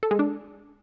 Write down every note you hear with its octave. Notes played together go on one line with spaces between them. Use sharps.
A4
G#3
D4